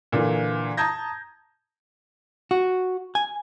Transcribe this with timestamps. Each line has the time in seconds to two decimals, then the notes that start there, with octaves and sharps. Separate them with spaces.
0.12 A#2 D3 E3
0.77 A5 A#5 D#6 G6 G#6 A#6
2.51 F#4
3.15 G#5